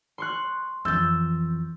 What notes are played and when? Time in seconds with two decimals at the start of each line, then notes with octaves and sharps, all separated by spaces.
0.18 C6 C#6 F#6
0.85 F2 E3 E6 G6 A6